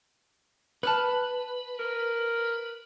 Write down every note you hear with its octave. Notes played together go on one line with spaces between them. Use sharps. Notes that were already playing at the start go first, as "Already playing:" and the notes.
B4 A5 F6 F#6
A#4